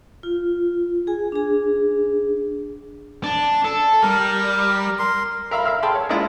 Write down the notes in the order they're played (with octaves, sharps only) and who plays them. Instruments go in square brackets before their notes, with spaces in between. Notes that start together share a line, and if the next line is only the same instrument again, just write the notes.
[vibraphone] F4
G#4 G#5
D4 G#4
[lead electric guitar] D4
A4
[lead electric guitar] G3 [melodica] A#4
[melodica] A#4 C6
[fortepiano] A#4 E5 F5 A#5 B5
E5 F5 B5 E6 F6
G#4 G5 A5 B5 C6
C#5
G#3 A#3 D4 E4 F4